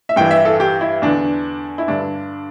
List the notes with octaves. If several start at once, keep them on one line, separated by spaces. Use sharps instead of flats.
E5
G2 E3 G5
E5
A4
G4
E4
E2 D3 D4
E4
G2 D3 D4